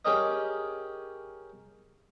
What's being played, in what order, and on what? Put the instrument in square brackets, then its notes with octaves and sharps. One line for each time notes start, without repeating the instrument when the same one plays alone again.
[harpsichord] C#4 G4 G#4 A#4 D#5